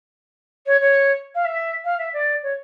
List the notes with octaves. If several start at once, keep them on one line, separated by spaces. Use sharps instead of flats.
C#5
C#5
F5
E5
F5
E5
D5
C#5